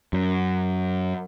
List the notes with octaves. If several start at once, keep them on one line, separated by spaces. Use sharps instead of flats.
F#2